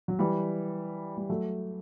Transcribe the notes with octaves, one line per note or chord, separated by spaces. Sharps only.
F#3
E3 G3
G3
F#3 A3